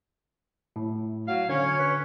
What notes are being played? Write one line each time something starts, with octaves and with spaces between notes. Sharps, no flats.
A2
F#3 F5
D3 C#4 C#5
B4